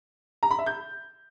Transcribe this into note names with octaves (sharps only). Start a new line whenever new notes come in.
A#5
B5
E5
G6